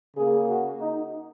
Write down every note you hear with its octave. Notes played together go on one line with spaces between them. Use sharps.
C#3 A#3 G#4
F#4
D#4